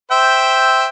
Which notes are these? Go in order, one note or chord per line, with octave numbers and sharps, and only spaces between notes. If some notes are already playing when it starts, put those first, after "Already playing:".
C5 E5 G5